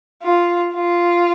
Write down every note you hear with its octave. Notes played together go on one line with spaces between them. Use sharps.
F4
F4